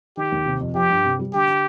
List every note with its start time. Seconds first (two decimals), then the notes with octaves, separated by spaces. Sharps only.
0.17 D#3 G4
0.32 D#2
0.46 C3
0.61 F2
0.75 F3 G4
0.90 G2
1.05 C3
1.19 G3
1.33 D3 G4
1.48 D4